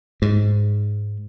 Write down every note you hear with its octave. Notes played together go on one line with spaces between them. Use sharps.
G#2